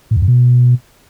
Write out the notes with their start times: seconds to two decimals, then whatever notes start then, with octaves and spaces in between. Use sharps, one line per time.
0.11 A2
0.16 E2
0.22 F#2
0.28 B2